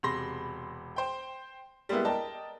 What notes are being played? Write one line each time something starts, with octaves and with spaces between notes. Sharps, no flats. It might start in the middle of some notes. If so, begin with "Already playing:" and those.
E1 C3 B5 C6 A#6
C5 G5
G3 G#3 A#3 B3 E4
A#4 D5 D#5 G5 A5